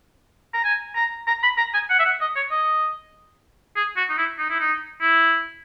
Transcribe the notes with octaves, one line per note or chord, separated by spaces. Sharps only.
A#5
G#5
A#5
A#5
B5
A#5
G#5
F#5
E5
F#5
D#5
C#5
D#5
G#4
F#4
D#4
E4
D#4
E4
D#4
E4